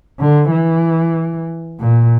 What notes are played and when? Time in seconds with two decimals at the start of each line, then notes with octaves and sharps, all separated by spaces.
0.19 D3
0.51 E3
1.80 A#2